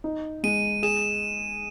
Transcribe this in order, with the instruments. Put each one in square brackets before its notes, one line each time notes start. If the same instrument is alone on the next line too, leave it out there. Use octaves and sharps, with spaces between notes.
[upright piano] D#4
[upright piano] G#3 [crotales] D#7
[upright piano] G#4 [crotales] E7